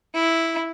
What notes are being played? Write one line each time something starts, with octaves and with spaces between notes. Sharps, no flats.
E4